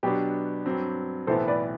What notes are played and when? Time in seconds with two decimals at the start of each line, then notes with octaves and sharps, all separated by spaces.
0.03 B2 F#3 B3 D4 G4 B4
0.66 G2 F#3 C4
1.27 B1 A2 E3 B3 A4 C5
1.48 B4 D5